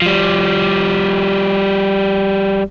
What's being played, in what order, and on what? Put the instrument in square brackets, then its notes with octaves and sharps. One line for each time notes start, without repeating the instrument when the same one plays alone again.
[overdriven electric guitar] F3 G3